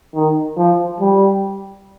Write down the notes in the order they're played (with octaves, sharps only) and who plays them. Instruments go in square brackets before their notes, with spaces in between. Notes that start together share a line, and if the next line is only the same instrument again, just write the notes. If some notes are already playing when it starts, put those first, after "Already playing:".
[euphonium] D#3
F3
G3